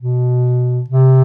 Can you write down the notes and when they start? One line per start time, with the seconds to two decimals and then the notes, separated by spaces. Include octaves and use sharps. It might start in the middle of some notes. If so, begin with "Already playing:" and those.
0.01 B2
0.90 C3